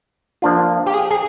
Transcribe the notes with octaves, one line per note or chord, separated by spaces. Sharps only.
F3 A#3 D4 F4
G4
G#4
G#4